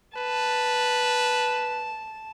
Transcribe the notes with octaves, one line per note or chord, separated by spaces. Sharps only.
B4 A5